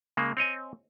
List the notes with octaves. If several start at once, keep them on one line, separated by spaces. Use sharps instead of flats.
C#3 G#3 A#3
C4 C#5 D#5 G#5